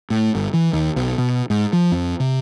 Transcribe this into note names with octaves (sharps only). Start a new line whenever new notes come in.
A2
G1
E3
D#2
B1
B2
G#2
F3
F2
C3